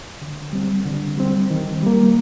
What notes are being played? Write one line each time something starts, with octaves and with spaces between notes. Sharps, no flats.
D3
G3 C4
D3
G3 C4
D#3
G3 A#3